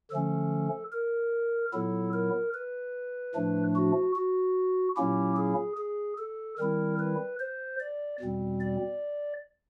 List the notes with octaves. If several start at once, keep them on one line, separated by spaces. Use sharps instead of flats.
D3 F3 A3 C#4 A4
A#4
A#2 F#3 B3 E4 A4
A#4
B4
A2 F3 A3 D4
F#4
F#4
A#2 F#3 A#3 C#4 E4 G4
G#4
G#4
A4
D#3 G3 C4 E4 A#4
B4
C5
D5
E2 B2 G3 C4
D5